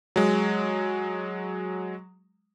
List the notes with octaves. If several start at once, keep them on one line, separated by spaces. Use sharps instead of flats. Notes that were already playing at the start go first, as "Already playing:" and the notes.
F#3 G#3